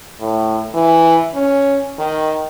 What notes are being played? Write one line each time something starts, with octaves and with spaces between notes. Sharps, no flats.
A2
E3
C#4
D#3